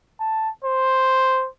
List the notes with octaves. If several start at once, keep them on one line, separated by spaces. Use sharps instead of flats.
A5
C5